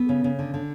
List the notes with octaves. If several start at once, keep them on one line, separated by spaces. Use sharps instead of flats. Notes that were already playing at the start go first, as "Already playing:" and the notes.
Already playing: B3 A4
C#3
C#3
D3
D3